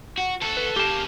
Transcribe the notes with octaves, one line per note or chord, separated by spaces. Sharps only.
F#4
D2 F#4 A4
B4
C#3 A#3 G4 A5